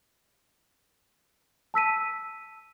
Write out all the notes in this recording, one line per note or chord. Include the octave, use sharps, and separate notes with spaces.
A5 E6 B6 D#7